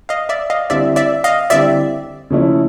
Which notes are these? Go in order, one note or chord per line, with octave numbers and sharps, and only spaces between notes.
D#5 F5
D5 E5
D#5 F5
D3 G3 C4 E4 G4 D5 E5
D5 E5
D#5 F5
D3 G3 C4 E4 G4 D5 E5
C#3 F3 A3 C#4 E4